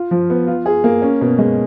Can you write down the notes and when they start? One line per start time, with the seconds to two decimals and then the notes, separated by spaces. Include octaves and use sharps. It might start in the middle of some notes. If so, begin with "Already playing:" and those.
Already playing: F4
0.11 F3
0.30 B3
0.47 F4
0.66 G#4
0.84 A#3
1.02 C#4
1.21 B2
1.39 G#3